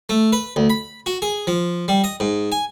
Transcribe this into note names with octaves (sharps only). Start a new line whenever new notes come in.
A3
B4
D2
B5
F#4
G#4
F3
G3
D#5
G#2
G#5